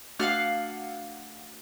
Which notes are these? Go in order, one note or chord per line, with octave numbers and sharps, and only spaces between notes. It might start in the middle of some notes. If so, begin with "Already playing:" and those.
A3 D4 F#4 F5 F#5 F6